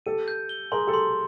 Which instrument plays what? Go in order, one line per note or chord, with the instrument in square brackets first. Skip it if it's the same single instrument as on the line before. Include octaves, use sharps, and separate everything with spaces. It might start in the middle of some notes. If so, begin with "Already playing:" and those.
[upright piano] G4 A4 [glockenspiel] D#7
[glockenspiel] G6
G7
[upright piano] G#4 A#4 [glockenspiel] C6
[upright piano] G4 A4
[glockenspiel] C6